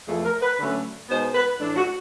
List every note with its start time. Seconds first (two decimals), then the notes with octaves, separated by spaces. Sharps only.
0.08 F2 C3 E3 A3 G#4
0.25 A#4
0.42 B4
0.58 D3 F#3 A3 C#4
1.09 B2 G#3 B3 D#4 C5
1.35 B4
1.59 A2 E3 A3 D4
1.76 F#4